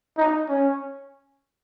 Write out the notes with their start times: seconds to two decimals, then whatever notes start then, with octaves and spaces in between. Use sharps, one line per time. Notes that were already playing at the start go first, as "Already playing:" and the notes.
0.17 D#4
0.49 C#4